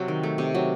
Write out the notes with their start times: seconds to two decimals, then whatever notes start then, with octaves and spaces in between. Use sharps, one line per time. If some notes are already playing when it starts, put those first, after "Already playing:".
Already playing: C3 F#3
0.08 D#3
0.23 A3
0.38 C3
0.55 F#3